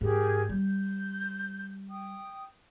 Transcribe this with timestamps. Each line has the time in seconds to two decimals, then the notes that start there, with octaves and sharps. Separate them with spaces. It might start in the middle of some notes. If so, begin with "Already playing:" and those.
0.01 G#2 G4 G#4 A#4
0.49 G3 G6
1.90 G5 D#6